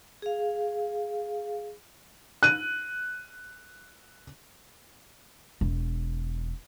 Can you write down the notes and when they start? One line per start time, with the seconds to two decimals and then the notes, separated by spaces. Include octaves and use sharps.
0.22 G#4 F5
2.43 F#6 D#7
5.61 E1